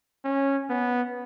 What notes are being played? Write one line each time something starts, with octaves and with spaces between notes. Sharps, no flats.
C#4
B3